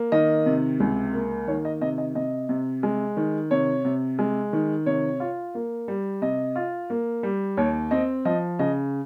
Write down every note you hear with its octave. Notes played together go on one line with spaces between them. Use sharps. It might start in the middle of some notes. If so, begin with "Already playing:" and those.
Already playing: A#3
D#3 D#5
C3
C#2
A#3
D#3 C#5
D#5
C3 D#5
D#5
C3 D#5
C3
G#3
D#3
C3 C#5
C3
G#3
D#3
C3 C#5
F4
A#3
G3
C3 D#5
F4
A#3
G3
D#2 C#5
C4 D#5
F3 D#5
C#3 D#5